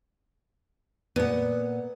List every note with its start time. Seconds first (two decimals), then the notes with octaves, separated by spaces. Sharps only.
1.16 A#2 B3 F#5